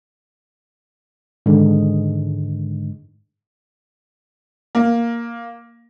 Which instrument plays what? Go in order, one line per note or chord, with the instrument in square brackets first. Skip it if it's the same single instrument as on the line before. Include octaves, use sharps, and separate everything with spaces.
[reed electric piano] G#2 D3 [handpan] D#3 G#3
[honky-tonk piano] A#3